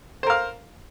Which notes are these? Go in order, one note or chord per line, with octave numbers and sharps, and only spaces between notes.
A#4 C5 F5